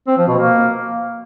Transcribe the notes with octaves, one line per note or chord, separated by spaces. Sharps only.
C4
F3
B2
A#3